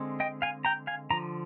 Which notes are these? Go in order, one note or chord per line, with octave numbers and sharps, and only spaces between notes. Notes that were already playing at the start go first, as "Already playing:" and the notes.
Already playing: D3 G#3 C4
D#5 G5
F5 G#5
G5 A#5
F5 G#5
D3 F3 A#5